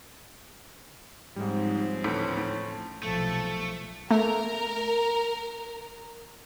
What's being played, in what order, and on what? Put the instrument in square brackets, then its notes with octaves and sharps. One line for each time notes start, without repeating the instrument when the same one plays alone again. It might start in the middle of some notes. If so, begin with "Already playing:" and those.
[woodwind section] G#2 [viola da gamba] F3 C4 C#4 [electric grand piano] G3 G#3
[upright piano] D2 A2 E3 [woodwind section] C#5 A5 [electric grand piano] B6
[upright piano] A2
[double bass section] B1 C3 [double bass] F3 [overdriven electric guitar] A3 [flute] A4
[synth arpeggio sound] A3 [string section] A#4